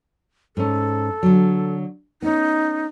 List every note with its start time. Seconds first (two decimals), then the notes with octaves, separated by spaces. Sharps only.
0.57 G#2 C#4 A4
1.23 D3 F#3
2.22 B3 C#4 D#4